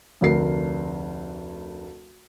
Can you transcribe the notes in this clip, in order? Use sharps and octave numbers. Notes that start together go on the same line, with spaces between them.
F1 D2 A#4 C7